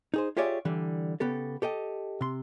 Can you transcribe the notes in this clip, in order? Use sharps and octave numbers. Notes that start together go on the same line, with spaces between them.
D#4 G#4 C5
F4 G4 G#4 C#5 D5 E5
D3 E3 G3
C#3 B3 G4 A4
G4 A4 D#5 G5
C3 C6